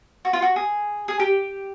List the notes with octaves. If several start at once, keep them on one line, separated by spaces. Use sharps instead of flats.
F#4
F4
F#4
G#4
G#4
G4